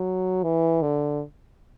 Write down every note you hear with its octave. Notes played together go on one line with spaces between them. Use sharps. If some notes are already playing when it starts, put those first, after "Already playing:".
Already playing: F#3
E3
D3